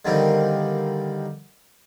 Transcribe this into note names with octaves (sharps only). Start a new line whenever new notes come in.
D3 D#3 G3 A#3 C4 D#4